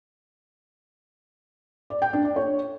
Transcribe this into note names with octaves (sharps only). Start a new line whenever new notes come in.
D5
G5
D4
D5
C#5